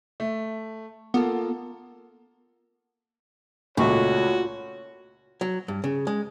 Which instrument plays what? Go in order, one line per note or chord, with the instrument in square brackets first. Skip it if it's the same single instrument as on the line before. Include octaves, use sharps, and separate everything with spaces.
[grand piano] A3
[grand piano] A#3 F4 A4 [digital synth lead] B3
[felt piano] C#2 A3 [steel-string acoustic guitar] A#2 [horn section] F#4 C#5
[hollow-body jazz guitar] F#3
G2
C#3
G#3